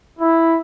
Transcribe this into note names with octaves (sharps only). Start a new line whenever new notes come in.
E4